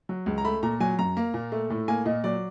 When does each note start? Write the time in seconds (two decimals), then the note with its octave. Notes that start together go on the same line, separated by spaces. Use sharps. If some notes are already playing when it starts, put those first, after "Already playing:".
0.09 F#3
0.26 C#2
0.38 A#5
0.45 A3 B5
0.63 A#2 A#5
0.80 F#3 G#5
0.99 F#2 A#5
1.17 A#3
1.34 A#2
1.52 A3
1.70 A2
1.88 A#3 G#5
2.06 A#2 D#5
2.24 F#3 D5